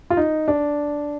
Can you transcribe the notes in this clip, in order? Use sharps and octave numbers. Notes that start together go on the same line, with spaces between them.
F4
D#4
D4